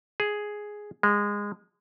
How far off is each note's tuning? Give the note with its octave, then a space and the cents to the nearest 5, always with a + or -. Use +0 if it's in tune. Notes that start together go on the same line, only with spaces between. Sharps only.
G#4 +5
G#3 -20